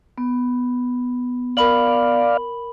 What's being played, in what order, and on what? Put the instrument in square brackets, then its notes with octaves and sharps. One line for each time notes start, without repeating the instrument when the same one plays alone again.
[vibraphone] B3
[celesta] A#4 B5 F#7 [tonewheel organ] D5 F5